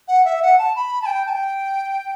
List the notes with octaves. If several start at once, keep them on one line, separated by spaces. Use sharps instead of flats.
F#5
E5
F#5
A5
B5
A5
G5
A5
G5